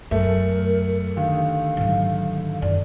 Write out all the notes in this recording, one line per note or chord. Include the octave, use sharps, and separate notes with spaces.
F#2 A3 A#4
D3 D#3 G4 F5
G#2 F#3
F#2 D5